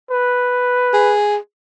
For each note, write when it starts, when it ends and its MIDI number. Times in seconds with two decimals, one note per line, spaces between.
0.11 1.16 71
0.93 1.36 68